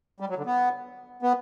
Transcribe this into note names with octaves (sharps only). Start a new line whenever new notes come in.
G3
F#3
D3
B3
B3